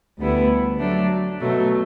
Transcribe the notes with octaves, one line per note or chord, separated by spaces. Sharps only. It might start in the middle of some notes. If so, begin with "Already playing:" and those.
D2 D3 G3 B3 E4
F#3 A3 D4
B2 F#3 A3